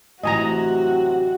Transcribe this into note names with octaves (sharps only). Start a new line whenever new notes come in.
A1 C3 E3 F#3 F#4 D#5 G#5 A#5